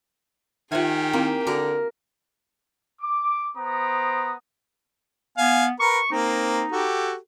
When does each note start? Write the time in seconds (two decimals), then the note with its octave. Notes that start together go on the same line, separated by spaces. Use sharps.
0.72 D#3 F4 G4 G#4 C5 E5 F#5 G#5
1.13 A#3 C4 D#4 E4
1.47 D3 F#4 A#4
3.01 D6
3.56 B3 C5 A#5 D6 D#6
5.38 B3 F5 G#5
5.80 A#4 B4 C#6
6.12 A#3 C4 D#4
6.72 F#4 G4 A4